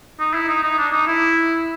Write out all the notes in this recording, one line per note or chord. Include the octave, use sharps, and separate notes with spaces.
D#4
E4
D#4
D#4
D4
D#4
E4